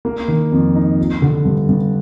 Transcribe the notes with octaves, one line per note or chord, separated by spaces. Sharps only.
A#3
D#3
F2
D#4
F3
D3
G2
G2